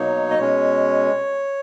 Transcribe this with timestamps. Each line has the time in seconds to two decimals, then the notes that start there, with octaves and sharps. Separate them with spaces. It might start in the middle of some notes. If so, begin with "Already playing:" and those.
Already playing: B2 F#3 A#3 D#4 C#5
0.30 D#5
0.39 B2 G#3 C#4 C#5